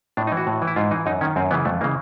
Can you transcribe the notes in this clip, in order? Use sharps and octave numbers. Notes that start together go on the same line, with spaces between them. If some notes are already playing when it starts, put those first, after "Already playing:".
A2 D4
D#4
E3
F#4
A2
E3
E4
G#2 F4
E3 D#4
F#2 D#4
D#3 C#4
F#2 C4
C#3 E3 B3
F2 A3
C#3 E3 A#3